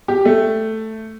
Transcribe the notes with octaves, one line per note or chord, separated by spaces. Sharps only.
G4
A3